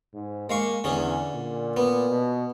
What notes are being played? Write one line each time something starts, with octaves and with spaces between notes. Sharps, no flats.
G#2
G#3 A#3 F5 C#6
E2 D3 C#4 G#4
A#2
B3
B2